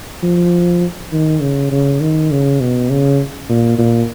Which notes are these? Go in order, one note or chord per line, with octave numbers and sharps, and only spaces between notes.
F3
D#3
C#3
C#3
D#3
C#3
B2
C#3
A#2
A#2